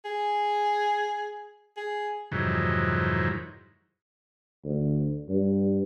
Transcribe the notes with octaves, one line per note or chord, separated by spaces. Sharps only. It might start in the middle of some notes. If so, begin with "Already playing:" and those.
G#4
G#4
F2 G#2 C3 D#3 E3 F#3
D2
G2